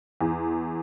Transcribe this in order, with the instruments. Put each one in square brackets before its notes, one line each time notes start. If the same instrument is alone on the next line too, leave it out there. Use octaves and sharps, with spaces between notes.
[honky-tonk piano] E2